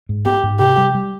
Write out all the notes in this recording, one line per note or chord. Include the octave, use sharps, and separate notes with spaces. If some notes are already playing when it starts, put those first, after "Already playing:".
G#2
B3 G4
G#2
C3 G4
G3
G3